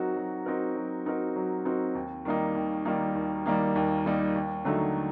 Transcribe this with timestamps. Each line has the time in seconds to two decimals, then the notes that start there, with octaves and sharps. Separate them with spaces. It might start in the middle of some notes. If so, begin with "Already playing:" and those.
Already playing: F#3 C4 D#4 F#4 A#4
0.16 F#3
0.46 C4 D#4 F#4 A#4
0.76 F#3
1.06 C4 D#4 F#4 A#4
1.36 F#3
1.65 C4 D#4 F#4 A#4
1.95 D#2
2.25 D#3 G3 A#3 D#4
2.55 D#2
2.85 D#3 G3 A#3 D#4
3.15 D#2
3.46 D#3 G3 A#3 D#4
3.76 D#2
4.05 D#3 G3 A#3 D#4
4.36 D#2
4.65 D3 F#3 A3 D#4